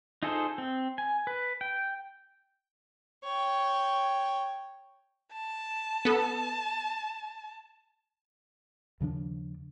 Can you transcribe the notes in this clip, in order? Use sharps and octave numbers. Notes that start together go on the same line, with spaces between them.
D#4 F4 G#4 A4 C5
C4
G#5
B4
G5
C#5 G5
A5
B3 A4
D#2 C#3 F3 D4